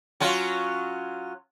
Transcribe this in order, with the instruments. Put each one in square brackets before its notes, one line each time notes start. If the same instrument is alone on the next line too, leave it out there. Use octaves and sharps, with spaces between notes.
[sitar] F#3 C#4 F4